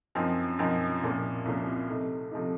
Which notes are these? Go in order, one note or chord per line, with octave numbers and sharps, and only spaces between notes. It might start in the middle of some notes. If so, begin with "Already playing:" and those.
F#2 F3 C4 D#4
F#2 F3 C4 D#4
C2 A#2 F3 A#3 C#4
C2 A#2 F3 A#3 C#4
C3 F3 A3 D#4
C3 F3 A3 D#4